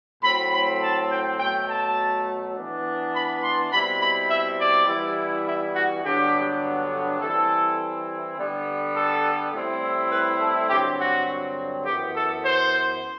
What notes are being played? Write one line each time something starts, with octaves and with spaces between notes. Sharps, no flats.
A2 F#3 C4 B5
B5
A5
G5
B2 F#3 A3 G5
A5
E3 B3 D4
B5
C6
B2 G3 C4 E4 B5
B5
E5
D5
E3 G3 B3 E4
E4
F#4
G2 D3 F#3 B3 D4 G4
E3 G3 C4 E4 A4
D3 G3 B3
A4
A2 G3 C4 E4
B4
A4
G2 D3 F#3 C4 G4
F#4
F#2 E3 B3 G4
A4
C5